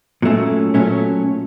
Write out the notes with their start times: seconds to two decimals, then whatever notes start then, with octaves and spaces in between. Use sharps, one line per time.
0.22 A#2 F#3 A3 C#4
0.74 A#2 F#3 A3 C#4